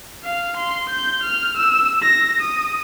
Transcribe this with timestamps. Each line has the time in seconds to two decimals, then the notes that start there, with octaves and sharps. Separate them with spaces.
0.24 F5
0.57 C6
0.89 G6
1.23 F6
1.57 E6
2.02 A#6
2.41 D#6